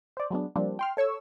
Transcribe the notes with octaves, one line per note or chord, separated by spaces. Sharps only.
C5 D5
F#3 G#3 B3 D4
F3 G3 A#3 C4 D4
G5 C6 F6
A4 C#5 C#6 E6